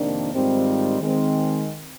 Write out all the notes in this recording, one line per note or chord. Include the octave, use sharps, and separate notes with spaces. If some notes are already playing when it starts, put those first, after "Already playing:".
Already playing: F2 C3 D#3 A#3 D4
G#2 D#3 G3 C4 F4
D#3 G#3 C4